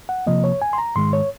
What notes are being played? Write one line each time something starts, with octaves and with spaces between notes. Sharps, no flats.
F#5
C3 F3 A#3 D#5
C#5
G#5
C6
A#5
G#2 D#3 G#3 C6
C#5